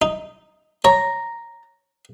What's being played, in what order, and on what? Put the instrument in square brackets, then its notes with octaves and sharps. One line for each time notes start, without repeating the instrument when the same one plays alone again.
[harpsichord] D#4
[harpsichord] C#5 [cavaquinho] A#5